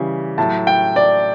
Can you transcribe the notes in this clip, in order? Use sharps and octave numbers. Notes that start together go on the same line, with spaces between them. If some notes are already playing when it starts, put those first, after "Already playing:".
Already playing: C#3 E3 G3
A2 F#3 A5
G5
D5